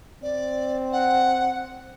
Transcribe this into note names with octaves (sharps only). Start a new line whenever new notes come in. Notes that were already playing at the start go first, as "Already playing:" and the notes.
C4 D5
F#5